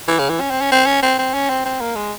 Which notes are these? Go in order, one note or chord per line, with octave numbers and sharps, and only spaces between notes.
E3
C#3
E3
C#4
C4
C#4
C4
C#4
C4
C4
C#4
C4
C4
A#3
G#3